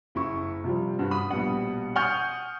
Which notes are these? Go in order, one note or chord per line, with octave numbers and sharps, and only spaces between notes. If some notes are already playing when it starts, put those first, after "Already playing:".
F#1 E4 C#6
C3 F3 G3
G2 F#4
B5 D#6
A#1 B2 G3 F#5
F#5 G#5 C#6 D#6 F6 G6